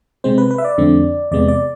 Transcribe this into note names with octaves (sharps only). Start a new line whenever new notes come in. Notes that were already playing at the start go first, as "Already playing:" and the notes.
C3 G#3 C4 C5
B4
B4
E5
D5
F2 D3 A3 C4
E2 C3 G#3 B3 D5
D5